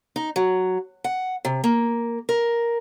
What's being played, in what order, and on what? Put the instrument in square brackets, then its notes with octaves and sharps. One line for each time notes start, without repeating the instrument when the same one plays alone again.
[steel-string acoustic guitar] D#4
F#3
F#5
C3
A#3
A#4